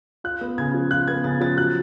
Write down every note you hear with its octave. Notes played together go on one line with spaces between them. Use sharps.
F4 F#6
B3
C#3 G#6
F3
F4 F#6
B3 G#6
C#3 A6
F3 A6
F#3 F#6